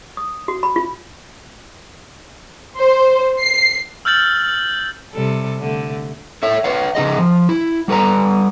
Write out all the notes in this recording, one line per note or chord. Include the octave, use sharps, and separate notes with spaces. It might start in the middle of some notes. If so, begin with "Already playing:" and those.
D#6
F#4
B5
F4
C5
C7
E6 F6 G6 A6 F#7
C3 G3 A4
D3 A3
A4 C#5 E5
B4 C#5 F5
C#3 D#4 G#4 D#5
F3
E4
G3 A4 B4 D5 A#5